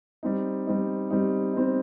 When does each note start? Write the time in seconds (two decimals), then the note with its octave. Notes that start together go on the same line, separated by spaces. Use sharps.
0.23 G3 C4 D#4
0.67 G3 C4 D#4
1.10 G3 C4 D#4
1.54 G3 C4 D#4